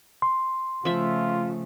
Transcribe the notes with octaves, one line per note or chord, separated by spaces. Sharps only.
C6
C#3 F3 A3 F4 E5